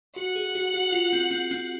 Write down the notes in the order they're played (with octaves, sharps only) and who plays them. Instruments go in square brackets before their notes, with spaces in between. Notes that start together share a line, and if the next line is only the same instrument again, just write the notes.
[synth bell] F#4 [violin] F#5
[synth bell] G#4
F#4
F#4
F4
C4
C4
C4